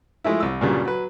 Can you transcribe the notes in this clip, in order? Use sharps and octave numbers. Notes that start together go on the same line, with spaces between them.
F3 G#3 A3 E4
C2 E6
G2 A#2 C#3 F#3 G3
F#3 B4